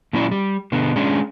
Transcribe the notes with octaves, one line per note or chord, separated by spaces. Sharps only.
A#2 F#3 C#4 E4 D5
G3
B2 D3 B3
G#3 C#4 D4